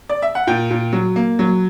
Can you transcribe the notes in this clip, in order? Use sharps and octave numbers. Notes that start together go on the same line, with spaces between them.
D5
E5
F#5
A#2 G5
A#2
F#3
A#3
F#3